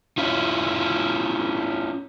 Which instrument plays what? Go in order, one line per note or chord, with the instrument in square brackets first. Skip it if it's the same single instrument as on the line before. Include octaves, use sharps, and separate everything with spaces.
[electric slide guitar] C#4 E4 F4